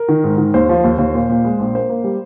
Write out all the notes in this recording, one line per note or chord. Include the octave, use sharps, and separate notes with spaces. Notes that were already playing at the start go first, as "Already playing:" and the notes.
Already playing: A#4
D#3
G#2
D#3
D#2 C5
F3
D#2
D#2
A#2
A#2
G#3
A#1
A#3 C5
A#3
G3